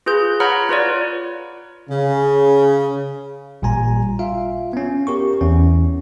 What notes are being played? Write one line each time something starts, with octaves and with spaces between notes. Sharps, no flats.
F4 G#4 B4 G6
C#5 F#5 A#5 B5 F6
F4 B4 C#5 D5
C#3
A1 A#2 G3 G#5 A#5
F4 E5 F5
B3 C#4
G4 A#4 C#6
E2 C#4